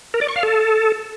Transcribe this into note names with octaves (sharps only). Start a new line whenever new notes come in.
A#4
D5
C#6
F5
A4